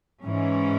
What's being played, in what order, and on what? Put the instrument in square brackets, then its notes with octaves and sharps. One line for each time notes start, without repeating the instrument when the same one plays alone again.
[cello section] G#2 E3 C#4